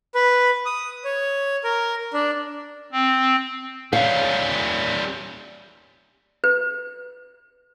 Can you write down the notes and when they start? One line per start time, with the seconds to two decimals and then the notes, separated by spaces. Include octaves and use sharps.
0.15 B4
0.66 D#6
1.05 C#5
1.64 A#4
2.14 D4
2.92 C4
3.93 G3 C#4 F5
6.44 B4